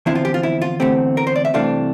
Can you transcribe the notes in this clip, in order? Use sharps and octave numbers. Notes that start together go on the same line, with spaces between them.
E2 D3 F3 C4 E4
F4
G4
F4
E4
F4
E2 D3 A3 C4 G4
A#4
C5
D5
E5
C2 C3 E3 A3 D4 F5